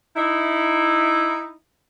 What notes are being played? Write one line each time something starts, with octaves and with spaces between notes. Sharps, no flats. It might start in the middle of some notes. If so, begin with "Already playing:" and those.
D#4 E4